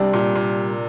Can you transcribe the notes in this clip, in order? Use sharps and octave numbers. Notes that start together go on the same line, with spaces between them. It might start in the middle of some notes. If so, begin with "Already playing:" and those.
Already playing: C3 G3 D4
A#2
A#2